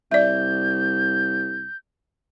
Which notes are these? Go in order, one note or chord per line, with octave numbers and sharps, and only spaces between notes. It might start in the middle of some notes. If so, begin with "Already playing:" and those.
C2 D5 E5 G6